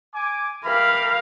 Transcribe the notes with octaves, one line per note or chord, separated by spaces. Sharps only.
G#5 D6
G4 A#4 E5 F5 B5